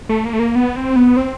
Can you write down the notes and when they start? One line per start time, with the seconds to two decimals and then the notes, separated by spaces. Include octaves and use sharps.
0.09 A3
0.25 A#3
0.33 A3
0.39 A#3
0.55 B3
0.76 C4
0.96 B3
1.17 C4